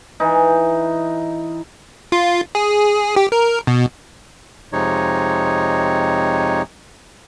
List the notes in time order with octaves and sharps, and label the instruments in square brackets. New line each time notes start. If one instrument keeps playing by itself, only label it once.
[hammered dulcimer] E3 D#4
[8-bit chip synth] F4
G#4
G4
A#4
B2
[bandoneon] F2 C3 G#3 D#4 C#5